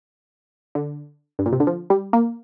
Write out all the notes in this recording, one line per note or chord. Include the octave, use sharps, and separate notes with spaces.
D3
G2
A#2
C3
D3
F3
G3
A#3